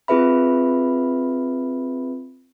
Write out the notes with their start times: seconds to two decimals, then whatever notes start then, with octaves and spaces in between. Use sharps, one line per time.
0.08 C4 F4 G#4 B4 E5 B5